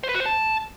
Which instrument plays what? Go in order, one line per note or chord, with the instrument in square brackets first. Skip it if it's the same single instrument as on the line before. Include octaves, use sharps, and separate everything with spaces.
[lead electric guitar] C5
B4
F#4
C5
A5